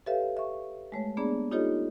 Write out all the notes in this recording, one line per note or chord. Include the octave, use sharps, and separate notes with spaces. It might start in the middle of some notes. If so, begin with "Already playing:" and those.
G4 A4 B4 C#5 E5 F5
E5 C#6
G#3 A3 C#5
A#3 B3 D4 G#4 D5
D#4 F4 G4 A4 C#5 D#5